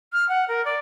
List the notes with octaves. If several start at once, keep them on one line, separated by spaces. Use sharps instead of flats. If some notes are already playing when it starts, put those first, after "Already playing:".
F6
F#5
A#4
D5